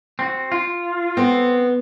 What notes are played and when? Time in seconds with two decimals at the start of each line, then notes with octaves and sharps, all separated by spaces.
0.19 C4 F#4
0.52 F4
1.17 B3 C4